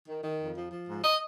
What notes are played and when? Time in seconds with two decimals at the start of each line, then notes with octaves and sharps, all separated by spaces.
0.08 D#3
0.24 D#3
0.40 F2
0.57 F3
0.72 F3
0.88 G#2
1.04 D#5